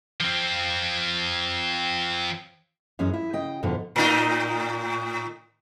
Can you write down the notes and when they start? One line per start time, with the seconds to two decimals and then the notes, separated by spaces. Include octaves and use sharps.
0.20 F3 C4
2.99 F#2 E3 G#3 C#4
3.14 E4
3.33 C#3 D#5 G5
3.63 F2 G#2 B2 D3 E4
3.96 A2 D#4